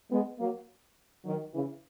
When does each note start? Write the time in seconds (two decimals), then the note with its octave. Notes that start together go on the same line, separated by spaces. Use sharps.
0.11 G#3 B3
0.39 F#3 A#3
1.25 D#3 F#3
1.53 C#3 E3